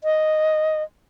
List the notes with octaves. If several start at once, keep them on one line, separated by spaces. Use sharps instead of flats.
D#5